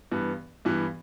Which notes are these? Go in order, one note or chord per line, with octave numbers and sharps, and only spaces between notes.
G2 E3 B3
G2 E3 B3